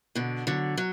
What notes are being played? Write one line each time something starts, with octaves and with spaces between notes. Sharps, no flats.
B2 D3
D3 F#3
F#3